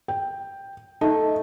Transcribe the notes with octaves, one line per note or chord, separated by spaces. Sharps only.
G5
A3 D#4 A4